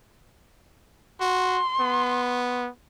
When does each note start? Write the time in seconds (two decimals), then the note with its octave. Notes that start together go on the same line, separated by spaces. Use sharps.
1.21 F#4 C6
1.80 B3